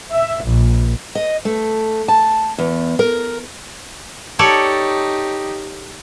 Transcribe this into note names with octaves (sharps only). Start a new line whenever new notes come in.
E5
A#1
D#5
A3
A5
E2
A#4
D#4 G4 A4 C#5 D5